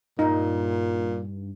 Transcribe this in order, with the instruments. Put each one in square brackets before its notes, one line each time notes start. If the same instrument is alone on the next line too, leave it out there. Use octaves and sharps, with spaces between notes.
[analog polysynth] G2 [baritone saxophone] A#2 [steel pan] D#4